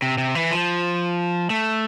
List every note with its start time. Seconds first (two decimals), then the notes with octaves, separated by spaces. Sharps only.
0.02 C3
0.18 C3
0.35 E3
0.51 F3
1.50 A3